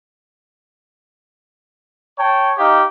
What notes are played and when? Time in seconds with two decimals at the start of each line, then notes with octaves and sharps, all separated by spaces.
2.17 C#5 G5 A5
2.58 D#4 G4 F5